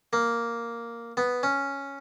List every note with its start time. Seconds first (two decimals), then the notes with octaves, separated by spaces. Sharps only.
0.13 A#3
1.17 B3
1.43 C#4